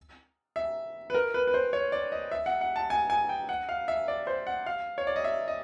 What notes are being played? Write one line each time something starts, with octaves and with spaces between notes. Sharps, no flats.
E5
B4
A#4
B4
B4
C5
C#5
D5
D#5
E5
F#5
F#5
A5
G#5
G#5
G5
F#5
F5
E5
D5
C5
F#5
F5
C#5
D5
D#5
E5
D#5